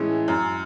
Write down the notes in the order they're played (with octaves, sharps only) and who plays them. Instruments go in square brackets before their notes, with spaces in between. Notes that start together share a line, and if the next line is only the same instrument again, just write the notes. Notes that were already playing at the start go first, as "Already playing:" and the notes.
Already playing: [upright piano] A2 E3 G#3 [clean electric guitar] C#4
[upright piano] F#2